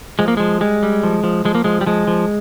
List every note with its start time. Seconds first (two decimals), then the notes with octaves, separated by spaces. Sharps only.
0.19 F3 G#3
0.28 A#3
0.37 F3 G#3
0.61 G3 G#3
0.83 G3
1.03 F3
1.24 F3
1.45 F3 G#3
1.55 A#3
1.64 F3 G#3
1.81 G3
1.86 F3 G#3
2.07 F3